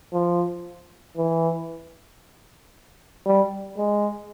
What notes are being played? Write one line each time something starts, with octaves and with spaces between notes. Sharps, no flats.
F3
E3
G3
G#3